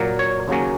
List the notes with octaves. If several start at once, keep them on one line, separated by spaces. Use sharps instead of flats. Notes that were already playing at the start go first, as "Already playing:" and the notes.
Already playing: A#2 F#3 A#3
C#5
D#2 C#3 F#3 A#3 C#4